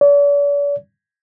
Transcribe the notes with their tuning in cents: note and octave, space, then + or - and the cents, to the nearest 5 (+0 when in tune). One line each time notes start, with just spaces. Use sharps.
D5 -45